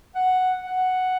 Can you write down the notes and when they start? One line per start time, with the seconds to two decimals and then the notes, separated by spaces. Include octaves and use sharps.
0.15 F#5
0.67 F#5